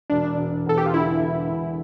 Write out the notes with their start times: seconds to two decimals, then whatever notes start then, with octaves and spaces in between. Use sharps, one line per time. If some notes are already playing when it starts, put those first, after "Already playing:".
0.10 E1 D4
0.38 E1
0.66 E2 A4
0.78 G4
0.86 F4
0.94 D3 E4
1.21 E1
1.49 E1